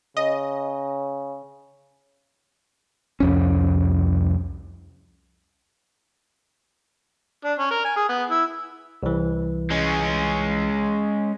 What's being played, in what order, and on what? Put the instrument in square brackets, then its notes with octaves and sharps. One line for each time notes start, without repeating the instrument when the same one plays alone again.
[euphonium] C#3 [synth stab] D#5
[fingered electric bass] C2 F2 C#4
[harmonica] D4
C#4
A#4
G#5
G#4
B3
E4
[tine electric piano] C2 E3
[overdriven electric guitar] G#3 C#4